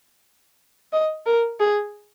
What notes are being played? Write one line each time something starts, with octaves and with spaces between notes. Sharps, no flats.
D#5
A#4
G#4